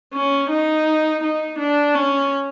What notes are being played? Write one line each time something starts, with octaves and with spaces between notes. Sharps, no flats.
C#4
D#4
D#4
D4
C#4